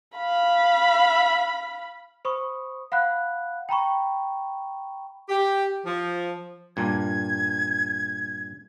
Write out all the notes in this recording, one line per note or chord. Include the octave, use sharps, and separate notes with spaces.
F5 B5
C5 B5 C#6 D#6
F5 F#5 B5 F#6
G5 A#5 B5 C#6
G4
F3
G2 A#2 G#6